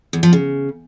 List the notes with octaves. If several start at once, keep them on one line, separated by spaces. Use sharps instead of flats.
E2
F3
C#3